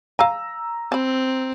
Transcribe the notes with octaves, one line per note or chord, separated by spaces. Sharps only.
F5 G#5 A#5 E6
C4 A5 B5